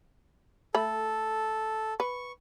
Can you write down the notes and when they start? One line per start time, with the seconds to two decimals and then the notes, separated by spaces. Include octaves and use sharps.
0.75 A3 A4 B5
2.00 B4 C#6